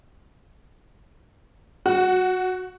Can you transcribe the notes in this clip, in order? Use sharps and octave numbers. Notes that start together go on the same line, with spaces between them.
F#4